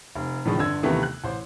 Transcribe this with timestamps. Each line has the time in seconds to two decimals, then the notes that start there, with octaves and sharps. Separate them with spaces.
0.16 F1
0.45 A2 D3 D#3 F3 G#3
0.58 G1 D3 E6 G#6
0.83 D#2 C3 D#3 E3 A3 B3
1.03 F#6
1.24 A1 C5